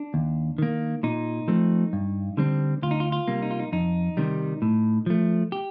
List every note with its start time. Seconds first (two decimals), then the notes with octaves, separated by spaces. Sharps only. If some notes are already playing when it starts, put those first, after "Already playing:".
Already playing: D4
0.14 D#2
0.58 D#3 A#3
1.03 A#2 D#4
1.48 F3 A3 C4
1.93 G2
2.37 D3 G3 C4
2.82 D2 F4
2.91 D#4
3.00 F4
3.12 F4
3.28 C3 G3 A#3
3.42 D#4
3.51 F4
3.60 D#4
3.72 F2 D#4
4.17 C3 D#3 G3
4.62 A2
5.06 F3 A3
5.52 G4